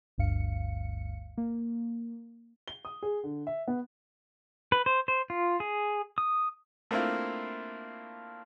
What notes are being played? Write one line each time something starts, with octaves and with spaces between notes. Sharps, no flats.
G1 D2 G2 F5 C#7
A#3
G7
D#6
G#4
D3
E5
B3
B4
C5
C5
F4
G#4
D#6
A3 A#3 C4 D4 E4 F4